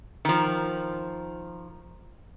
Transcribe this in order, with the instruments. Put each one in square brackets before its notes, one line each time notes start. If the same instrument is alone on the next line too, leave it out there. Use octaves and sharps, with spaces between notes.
[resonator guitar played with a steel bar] D#3 F3